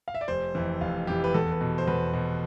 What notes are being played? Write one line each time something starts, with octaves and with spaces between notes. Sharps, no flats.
F5
E5
D5
F1 C5
F2 E3
F1 F5
F2 E3 G4
B4
E2 A4
B4
B2
C5
E2 B4
B2